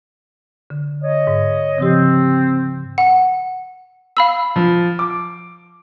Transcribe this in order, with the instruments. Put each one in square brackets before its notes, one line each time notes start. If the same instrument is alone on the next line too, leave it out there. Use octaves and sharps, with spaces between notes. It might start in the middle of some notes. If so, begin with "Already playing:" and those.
[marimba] D3
[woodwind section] C#5 D#5
[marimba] G#2
[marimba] C#3 F3 G4 [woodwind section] C4
[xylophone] F#5
F5 B5 E6
[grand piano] F3
D6